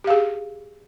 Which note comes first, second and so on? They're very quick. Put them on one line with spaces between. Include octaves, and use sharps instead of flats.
G4 F5 G#4